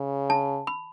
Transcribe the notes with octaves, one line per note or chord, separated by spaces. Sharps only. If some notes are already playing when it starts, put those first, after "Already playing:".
Already playing: C#3
A5
B5